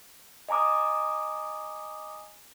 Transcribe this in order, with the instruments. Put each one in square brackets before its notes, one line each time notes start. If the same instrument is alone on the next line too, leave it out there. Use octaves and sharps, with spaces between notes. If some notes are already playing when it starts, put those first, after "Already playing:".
[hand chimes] D#5 G#5 A#5 D6 D#6